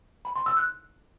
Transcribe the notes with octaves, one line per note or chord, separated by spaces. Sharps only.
B5
C6
E6
F#6